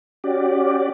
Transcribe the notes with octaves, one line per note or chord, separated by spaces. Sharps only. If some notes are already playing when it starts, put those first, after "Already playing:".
C#4 F#4 G4 D5